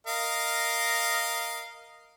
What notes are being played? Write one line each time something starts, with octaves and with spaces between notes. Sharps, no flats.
A#4 D#5 F5